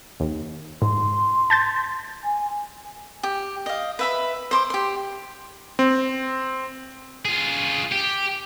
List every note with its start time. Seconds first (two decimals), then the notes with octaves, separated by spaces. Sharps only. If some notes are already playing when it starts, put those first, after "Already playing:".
0.20 D#2
0.82 G#2 C6
1.50 A5 G6 A6
2.23 G#5
3.23 G4
3.66 D#5 F5
3.99 B4 E5 B5
4.51 C5 C6 D6
4.70 G4 C6
5.79 C4
7.25 F4 G#4
7.92 G4